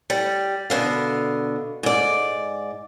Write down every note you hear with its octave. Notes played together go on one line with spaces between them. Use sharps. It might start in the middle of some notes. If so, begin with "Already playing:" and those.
G3
B2 D3 F5
G#2 D5